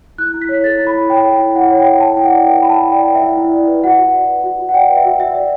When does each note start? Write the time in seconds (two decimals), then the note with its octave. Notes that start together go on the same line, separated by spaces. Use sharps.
0.18 E4 F#6
0.34 E4
0.42 B6
0.49 C#5
0.64 A4 A6
0.78 E4
0.87 B5
0.94 E4
1.10 C#5 G5
1.24 A4
1.39 E4
1.55 E4 F#5
1.71 C#5
1.78 G5
1.86 A4
2.00 E4 A5
2.16 E4 G5
2.24 F#5
2.30 D5
2.46 B4 G5
2.62 E4 B5
2.69 A5
2.76 E4
2.92 D5 G5
3.07 B4
3.15 E5
3.22 E4
3.37 E4
3.53 D5
3.67 B4
3.84 F#4 F#5
3.99 F#4
4.13 D5
4.28 B4
4.44 F#4
4.59 F#4
4.69 F#5
4.74 D5 G5
4.89 B4
4.96 E5
5.05 F#4
5.20 F#4 E5
5.34 D5